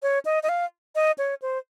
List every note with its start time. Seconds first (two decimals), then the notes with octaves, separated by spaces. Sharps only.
0.03 C#5
0.25 D#5
0.43 D#5
0.49 F5
0.95 D#5
1.18 C#5
1.42 C5